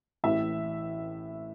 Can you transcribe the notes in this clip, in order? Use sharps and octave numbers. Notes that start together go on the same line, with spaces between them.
A1 A2 E3 E5